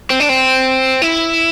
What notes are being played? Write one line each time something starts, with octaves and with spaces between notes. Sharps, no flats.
C4
D4
C4
E4